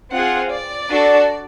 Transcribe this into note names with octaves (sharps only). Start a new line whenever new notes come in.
C4 F4 G#4 F#5
D5
D4 F#4 A4